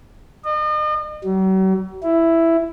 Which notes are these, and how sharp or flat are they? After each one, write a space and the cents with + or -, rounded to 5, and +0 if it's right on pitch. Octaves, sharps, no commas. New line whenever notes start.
D#5 -40
F#3 +45
E4 +5